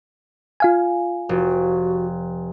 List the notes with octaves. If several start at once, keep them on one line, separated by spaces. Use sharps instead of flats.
F4 F5 G#5
F1 F#4